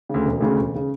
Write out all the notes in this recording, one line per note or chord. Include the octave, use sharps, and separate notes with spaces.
D2 C#3
E1
D2 C#3
E1
C#3